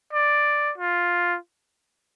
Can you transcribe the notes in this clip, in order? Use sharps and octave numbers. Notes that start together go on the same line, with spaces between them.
D5
F4